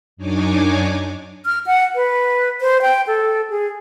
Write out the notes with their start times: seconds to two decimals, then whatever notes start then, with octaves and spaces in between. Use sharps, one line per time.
0.17 F#2 D4 D#4 C#5 G#5 D6
1.46 F6
1.67 F#5
1.95 B4
2.61 C5
2.82 G5
3.07 A4
3.50 G#4